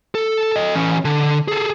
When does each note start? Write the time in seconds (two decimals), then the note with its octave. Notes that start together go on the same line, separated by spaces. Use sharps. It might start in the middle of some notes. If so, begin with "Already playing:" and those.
0.15 A4
0.52 A4 D#5
0.75 E3 C#4
1.05 D3
1.48 G#4 A4